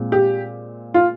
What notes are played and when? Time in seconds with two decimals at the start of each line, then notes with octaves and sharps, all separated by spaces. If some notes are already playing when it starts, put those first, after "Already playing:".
Already playing: A#2 G#3 C4
0.12 G4
0.94 F4